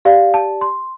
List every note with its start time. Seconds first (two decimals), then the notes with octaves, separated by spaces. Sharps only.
0.05 G4 D5 F5
0.34 A5
0.61 C6